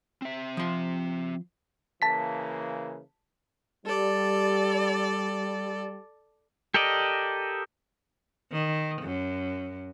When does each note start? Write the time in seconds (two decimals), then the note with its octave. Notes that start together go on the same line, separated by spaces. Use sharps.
0.22 C4 E5
0.57 F3 C6
2.02 C#3 E3 A#3 A5 B6
3.86 G3 A4 D5
6.74 G4 A4 A#4 D5 D#5
8.52 D#3
9.02 F#2